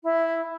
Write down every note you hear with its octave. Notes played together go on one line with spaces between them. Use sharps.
E4